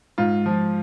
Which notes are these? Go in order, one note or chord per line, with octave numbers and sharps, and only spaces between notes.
G#2 F4
F3